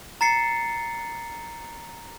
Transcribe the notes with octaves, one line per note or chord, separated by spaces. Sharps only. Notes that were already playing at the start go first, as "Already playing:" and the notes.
A#5 A6 C7 C#7